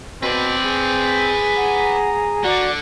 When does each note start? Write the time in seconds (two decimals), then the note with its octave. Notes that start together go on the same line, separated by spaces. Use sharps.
0.23 B2 C4 B4 D5
0.64 G#4
1.56 F#5 A#5
2.44 D3 F#4 D5